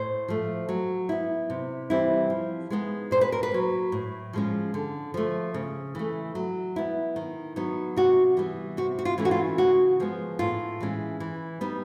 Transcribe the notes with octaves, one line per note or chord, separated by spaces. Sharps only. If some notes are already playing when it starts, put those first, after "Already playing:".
Already playing: A2 C5
F3 A3
F#3
B3 E4
C3
E3 G3 C4 E4
F3
G#3 B3 D#4
A#2 C5
B4
A#4
B4
F#3 A#3
A2
F3 G#3 C#4
D3
F3 A3
C#3
E3 A3
F#3
B3 E4
D#3
F#3 B3 D#4
C3 F#4
E3 G3 B3
C3 F#4
F#4
F4
E3 A3 C#4
F#4
F4
C#3 F#4
F3 G#3 B3
A2 F4
E3 G#3 C#4
E3
G3 B3 D#4